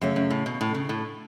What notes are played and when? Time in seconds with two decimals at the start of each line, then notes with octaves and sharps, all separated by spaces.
0.01 F#2 C#3 A3 C#4
0.16 F#2
0.30 A2
0.46 B2
0.61 A2
0.74 C#3
0.89 A2